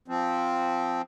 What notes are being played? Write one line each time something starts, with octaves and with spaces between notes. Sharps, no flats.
F3 C4